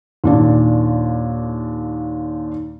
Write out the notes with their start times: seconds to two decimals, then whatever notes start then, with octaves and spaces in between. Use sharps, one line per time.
0.24 D#2 A#2 D4